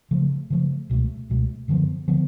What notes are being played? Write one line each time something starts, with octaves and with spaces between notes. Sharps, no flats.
C#3 F3 A3
C#3 F3 A3
C#2 B2 A3
C#2 B2 A3
F#2 D3 F3 B3
D3 F3 B3